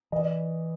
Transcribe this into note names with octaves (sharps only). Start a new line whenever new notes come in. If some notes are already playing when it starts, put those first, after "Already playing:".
E3 D#5
D5